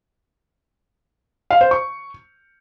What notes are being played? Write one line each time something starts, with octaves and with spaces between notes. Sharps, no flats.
F5
C5
C#6